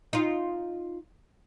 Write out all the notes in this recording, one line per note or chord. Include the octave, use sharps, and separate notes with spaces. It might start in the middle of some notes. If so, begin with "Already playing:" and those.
D#4 F4